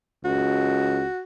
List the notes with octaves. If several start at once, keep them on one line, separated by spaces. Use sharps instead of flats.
C#2 F#4